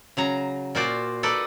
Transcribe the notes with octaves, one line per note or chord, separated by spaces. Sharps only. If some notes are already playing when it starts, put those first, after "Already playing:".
C#3 F#3 A#5
A#2 F4 F#4 C5 D5
D#4 A4 B4 D5 D#5